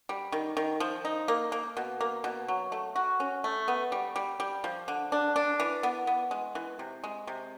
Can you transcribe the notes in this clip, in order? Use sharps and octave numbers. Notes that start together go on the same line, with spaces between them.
G3
D#3
D#3
F3
D#4
A#3
A#3
B2
A#3
B2
F#3
A3
F#4
C#4
A3
B3
G3
G3
G3
F3
D3
D4
D4
E3
B3
B3
G#3
E3
C3
G#3
C3